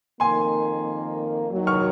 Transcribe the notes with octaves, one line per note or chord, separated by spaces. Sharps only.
F2 D#3 A#3 G#5 C6
D#2 D#3 F#3
C#6 F6